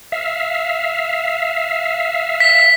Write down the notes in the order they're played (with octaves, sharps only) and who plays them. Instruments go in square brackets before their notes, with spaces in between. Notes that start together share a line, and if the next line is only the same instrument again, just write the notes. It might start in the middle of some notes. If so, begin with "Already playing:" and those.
[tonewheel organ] E5 F5
[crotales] B6